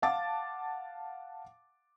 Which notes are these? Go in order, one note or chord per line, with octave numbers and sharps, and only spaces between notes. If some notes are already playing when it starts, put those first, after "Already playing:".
F5 F#5 A5 D6 A6